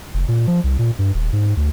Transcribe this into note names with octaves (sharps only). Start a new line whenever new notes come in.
F1
A#2
F3
C2
A#2
G2
D#1
G#2
D2